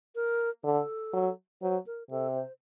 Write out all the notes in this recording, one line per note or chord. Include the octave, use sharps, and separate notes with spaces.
A#4
D3 A4
F#3
F#3 C5
A#4
C3 A4
C5